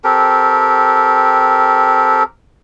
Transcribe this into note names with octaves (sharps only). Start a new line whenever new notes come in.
C4 G4 A4 A#4